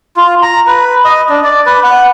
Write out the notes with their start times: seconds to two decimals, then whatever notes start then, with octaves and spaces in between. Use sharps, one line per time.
0.17 F4
0.42 A#5
0.67 B4
1.05 D#5
1.29 D4
1.44 D5
1.66 B4
1.84 F#5